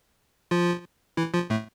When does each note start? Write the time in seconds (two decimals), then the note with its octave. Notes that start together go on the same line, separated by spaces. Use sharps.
0.51 F3 F4
1.17 E3 E4
1.34 F3 F4
1.50 A2 A3